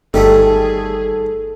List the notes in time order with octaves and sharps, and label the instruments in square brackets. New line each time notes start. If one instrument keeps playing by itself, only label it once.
[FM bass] G1 [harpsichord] D#3 G3 A3 [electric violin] G#4 [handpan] A4